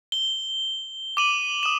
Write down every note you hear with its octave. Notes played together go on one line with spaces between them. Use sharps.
G7
D6 D#7 F#7
D#6 E7